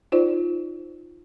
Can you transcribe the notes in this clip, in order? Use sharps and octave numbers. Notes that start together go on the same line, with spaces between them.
D#4 F4 C5 D5